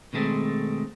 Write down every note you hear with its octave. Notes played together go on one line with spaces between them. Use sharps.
B2 D#3 G#3 A3 C4